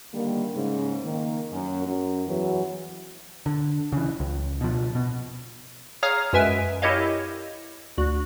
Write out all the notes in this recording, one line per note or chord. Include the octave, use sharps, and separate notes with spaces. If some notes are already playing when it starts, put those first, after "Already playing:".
D3 D#3 G3 A#3
G#2 C#3
D#3 A#3
F#2
F#2
E2 E3 F#3
D3
C#3 E3
C#2
B2 F3
B2
G#4 C#5 F5 A#5 D#6 F6
F#2 G#3 B4 E5 G#5 D7
E4 G4 A#4 C#5 D#5 F5
D2 F#4